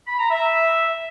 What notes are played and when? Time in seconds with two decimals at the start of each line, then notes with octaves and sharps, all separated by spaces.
0.07 B5
0.19 A#5
0.31 E5